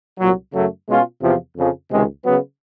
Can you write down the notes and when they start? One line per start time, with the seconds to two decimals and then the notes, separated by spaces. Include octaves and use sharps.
0.19 C2 A#2 F#3
0.53 F#2 C#3 F#3 A3
0.88 B2 G#3 C#4 F4
1.22 E2 C3 F3
1.56 F2 C#3 F3
1.91 C#2 C3 D#3 G#3
2.25 C#3 F#3 B3